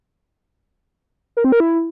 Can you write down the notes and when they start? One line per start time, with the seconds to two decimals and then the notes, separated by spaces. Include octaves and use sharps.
1.37 A#4
1.44 C4
1.52 A#4
1.60 E4